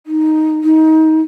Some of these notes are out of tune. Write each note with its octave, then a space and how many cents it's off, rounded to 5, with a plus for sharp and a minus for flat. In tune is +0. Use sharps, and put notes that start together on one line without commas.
D#4 +5
D#4 +25